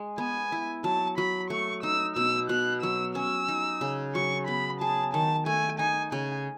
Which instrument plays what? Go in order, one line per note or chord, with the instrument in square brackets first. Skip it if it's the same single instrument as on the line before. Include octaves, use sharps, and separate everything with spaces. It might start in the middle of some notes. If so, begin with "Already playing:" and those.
Already playing: [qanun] G#3
[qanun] B3 [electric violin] G#5
[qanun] E4
[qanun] F#3 [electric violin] A5
[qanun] F#3 [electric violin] B5
[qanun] A3 [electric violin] C#6
[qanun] D#4 [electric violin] E6
[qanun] B2 [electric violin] E6
[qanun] B2 [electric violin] F#6
[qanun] F#3 [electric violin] E6
[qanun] C#4 [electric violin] E6
[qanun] D#4
C#3
[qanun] F#3 [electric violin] C#6
[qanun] B3 [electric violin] B5
[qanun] G#4 [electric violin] A5
[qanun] D#3 [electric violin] A5
[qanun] A3 [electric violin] G#5
[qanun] D#4 [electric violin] G#5
[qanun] C#3 [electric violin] G#5